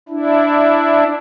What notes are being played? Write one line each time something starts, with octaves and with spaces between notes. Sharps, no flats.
D4 E4